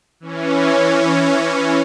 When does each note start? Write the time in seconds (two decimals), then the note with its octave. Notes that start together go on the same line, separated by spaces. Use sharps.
0.20 E3 C#4